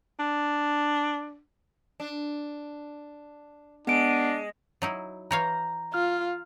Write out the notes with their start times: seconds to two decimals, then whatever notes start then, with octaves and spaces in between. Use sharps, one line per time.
0.19 D4
2.00 D4
3.87 G#3 B3 D4 D7
4.82 F#3 D#4 E4
5.31 E3 C#5 F5 A#5 G6
5.94 F4 F6